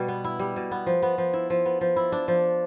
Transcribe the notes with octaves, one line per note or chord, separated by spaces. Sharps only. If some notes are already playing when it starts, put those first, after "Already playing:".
Already playing: B2 G3
B3
E4
G3
B2
B3
F3
B3
F3
E4
F3
B3
F3
E4
D4
F3